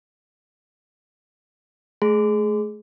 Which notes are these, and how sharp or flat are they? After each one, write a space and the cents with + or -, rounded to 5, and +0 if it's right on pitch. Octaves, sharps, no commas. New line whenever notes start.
A3 -30 G#4 +15 C6 -35